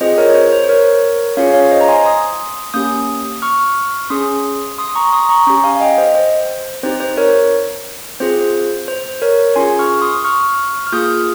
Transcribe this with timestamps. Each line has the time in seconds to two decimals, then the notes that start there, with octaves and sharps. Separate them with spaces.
0.01 C4 F4 G#4 C5 D#5
0.18 A#4 C#5
0.29 C#5
0.35 C5
0.52 C5
0.64 C5
0.69 A#4 C#5
1.37 C#4 F4 G#4 C#5 F5
1.54 C#5 F5
1.71 C5 D#5
1.81 A#5
1.88 G#5 C6
2.05 C6 D#6
2.74 A#3 C#4 G4 D#6 G6
3.42 C#6 F6
4.10 C#4 G#4 C6 D#6
4.78 C6 D#6
4.95 A#5 C#6
5.12 C6 D#6
5.29 A#5 C#6
5.47 C#4 G4
5.64 F5 G#5
5.75 F5
5.81 D#5 G5
5.98 C5 D#5
6.15 C5
6.83 C4 D#4 G4 C5
7.00 C5
7.17 A#4 C#5
8.20 C4 F4 G#4 C5
8.88 C5
9.22 A#4 C#5
9.56 C#4 F4 G#4 G#5 C6
9.79 C#6 F6
10.02 C6 D#6
10.25 C#6 F6
10.87 F6
10.93 A#3 F4 G#4 D#6 G6